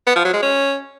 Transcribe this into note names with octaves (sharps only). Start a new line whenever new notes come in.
B3
F3
F#3
G#3
C#4